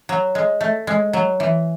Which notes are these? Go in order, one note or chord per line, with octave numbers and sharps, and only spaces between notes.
F#3
G#3
A3
G#3
F#3
E3